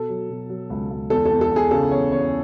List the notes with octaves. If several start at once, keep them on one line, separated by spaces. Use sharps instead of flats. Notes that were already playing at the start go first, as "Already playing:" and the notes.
Already playing: B2 A4
F#3
B2
F#3
C#2
C#2
E2 A4
A4
E2
A4
E2
G#4
C#3 A4
E2 C#5
E2 C#5